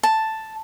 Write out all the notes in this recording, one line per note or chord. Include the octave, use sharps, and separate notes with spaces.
A5